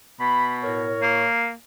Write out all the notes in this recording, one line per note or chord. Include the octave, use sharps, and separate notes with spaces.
B2 B5
A2 A#4 C#5
A#3